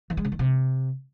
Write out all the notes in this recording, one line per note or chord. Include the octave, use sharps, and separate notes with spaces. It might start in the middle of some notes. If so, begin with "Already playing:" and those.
E3
G#3
C#3
D#3
C3